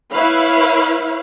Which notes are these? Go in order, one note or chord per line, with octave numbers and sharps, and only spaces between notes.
E4 B4 C#5 F5 B5